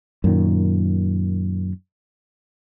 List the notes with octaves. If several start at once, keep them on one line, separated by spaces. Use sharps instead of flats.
F#2 A#2 D#3